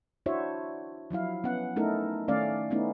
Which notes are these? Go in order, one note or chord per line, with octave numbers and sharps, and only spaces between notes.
D4 E4 F#4 C5 C#5 E5
F3 F#3 E4 F5
B3 C#4 F#5
A3 C#4 D#4 E4 A4 A#4
D#3 A3 C#4 D5 F5
A3 B3 C#4 D#4 E4